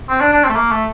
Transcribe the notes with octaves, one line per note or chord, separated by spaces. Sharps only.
C4
D4
D4
C4
A3
A#3
A3